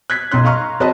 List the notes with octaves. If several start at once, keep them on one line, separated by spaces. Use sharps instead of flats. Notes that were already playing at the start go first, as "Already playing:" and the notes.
F#6 G#6 B6
B1 F#2 D#4 C6 F#6
D#5 F5 A#5 C6 C#6 F6
F2 F#4 B4 D#5 A5